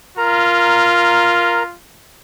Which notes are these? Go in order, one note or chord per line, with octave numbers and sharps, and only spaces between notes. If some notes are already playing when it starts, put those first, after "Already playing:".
F4 A#4 A#5